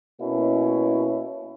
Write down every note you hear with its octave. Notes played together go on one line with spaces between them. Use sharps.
B2 A#3 C#4 E4